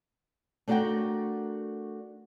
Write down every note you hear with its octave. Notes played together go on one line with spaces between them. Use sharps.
A3 D4 F#4 A#4 F#5 G5